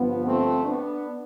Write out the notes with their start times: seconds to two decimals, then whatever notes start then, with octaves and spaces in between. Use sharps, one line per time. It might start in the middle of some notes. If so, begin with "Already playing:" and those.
Already playing: G1 G2 F3 B3
0.26 A3 C4
0.65 B3 D4